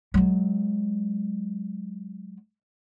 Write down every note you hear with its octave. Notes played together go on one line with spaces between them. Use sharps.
F#3 G#3